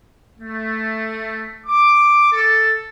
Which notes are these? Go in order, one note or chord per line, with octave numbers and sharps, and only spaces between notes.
A3
D6
A4